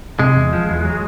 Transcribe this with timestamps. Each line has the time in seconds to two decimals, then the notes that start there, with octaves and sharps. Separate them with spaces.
0.19 C3 G#3
0.36 E2
0.53 F3
0.69 E2
0.85 F#3